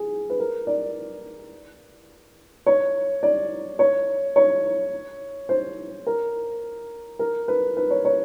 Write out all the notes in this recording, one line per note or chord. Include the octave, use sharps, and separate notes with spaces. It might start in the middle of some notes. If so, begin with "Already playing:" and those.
Already playing: G#4
B4
A#4
D5
C#5
D5
C#5
C#5
C5
A#4
A#4
B4
B4
C#5
C#5